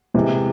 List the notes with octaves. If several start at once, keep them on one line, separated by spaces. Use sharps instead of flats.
C3 E3 G#3